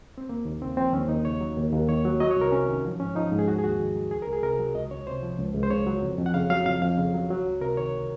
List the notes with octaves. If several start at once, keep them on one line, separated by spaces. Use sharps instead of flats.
C4
D#2 A#3
D#2
C#3 C4
F3 C4
D#2 C#4
D#2 D#4
C#3 C#5
F#3
D#2
D#2
D#3 C#5
F#3
F#3 D#5
C#5
C2 A#4
C3 C#4
D#3
F3
G#2 C#4
F3 D#4
G#2
G#4
D#2 F#4
G#4
D#2 F#4
D#3
F#3
C#2 G#4
A#4
C#2
G#4
C3 A#4
F#3
C#2 D#5
C#2 C#5
C3 C5
F3
C#2
C#2
C5
C#3 C#5
F#3
F2
F2
F#5
C#3 F5
F#3 F5
F2 F5
F2 F5
C#3
F#3
F#3
C#2
C3 A#4
D#3 C#5